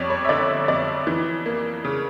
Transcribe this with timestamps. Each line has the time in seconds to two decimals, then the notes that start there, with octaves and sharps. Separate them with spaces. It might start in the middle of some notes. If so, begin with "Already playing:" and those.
Already playing: F2 G3 C#5 D5
0.10 C#5
0.25 E5
0.29 D3 D5
0.68 F2 D5
1.07 E3
1.46 A#3
1.85 C#3